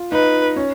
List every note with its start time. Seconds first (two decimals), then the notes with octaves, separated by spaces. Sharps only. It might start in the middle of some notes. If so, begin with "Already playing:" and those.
Already playing: F4
0.12 D#4 B4
0.56 C#4